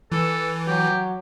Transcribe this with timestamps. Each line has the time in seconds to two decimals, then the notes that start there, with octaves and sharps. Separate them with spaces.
0.12 E3 A4
0.68 F#3 G4